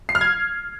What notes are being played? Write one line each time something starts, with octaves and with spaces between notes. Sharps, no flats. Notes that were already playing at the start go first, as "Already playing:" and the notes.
C7
F6
G#6